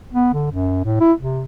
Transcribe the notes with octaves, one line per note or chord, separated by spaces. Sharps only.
B3
D3
F#2
A2
E4
C3